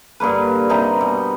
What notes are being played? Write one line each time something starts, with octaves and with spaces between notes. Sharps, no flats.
G2 D3 A#3 B4
C3 D#4 B4 A#5
B2